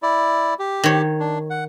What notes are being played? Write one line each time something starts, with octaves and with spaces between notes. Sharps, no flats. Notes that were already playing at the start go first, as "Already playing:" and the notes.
E4 D5
G4
D#3 C#5
D4
F#5